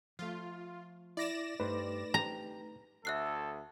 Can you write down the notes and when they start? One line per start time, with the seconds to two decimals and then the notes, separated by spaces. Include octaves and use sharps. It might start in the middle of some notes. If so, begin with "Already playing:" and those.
0.19 F3 A3 F4
1.17 E4 D5 A#6 E7
1.60 G2 G3 A3 D#4 B4 C5
2.14 G4 A#5
3.05 D2 A4 E5 F#6 C7